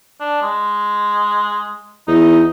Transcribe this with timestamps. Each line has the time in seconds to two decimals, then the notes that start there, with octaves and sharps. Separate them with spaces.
0.20 D4
0.42 G#3
2.07 E2 D#4